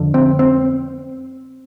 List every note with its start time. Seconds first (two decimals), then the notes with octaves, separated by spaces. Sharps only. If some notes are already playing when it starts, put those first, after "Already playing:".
Already playing: F2 D3
0.14 C4
0.39 C4